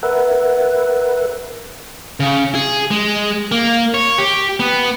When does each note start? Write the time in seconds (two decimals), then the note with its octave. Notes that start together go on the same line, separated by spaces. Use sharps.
0.03 A#4 B4 E5 F#5
2.20 C#3
2.55 G#4
2.91 G#3
3.52 A#3
3.94 C#5
4.18 G4
4.60 B3